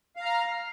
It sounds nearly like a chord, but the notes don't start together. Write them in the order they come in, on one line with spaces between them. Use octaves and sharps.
F5 A#5 F6